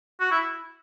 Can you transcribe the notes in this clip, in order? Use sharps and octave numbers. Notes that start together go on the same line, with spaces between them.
F#4
E4